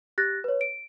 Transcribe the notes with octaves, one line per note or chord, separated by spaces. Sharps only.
G4 F#6 A6 A#6
B4 C#5
D7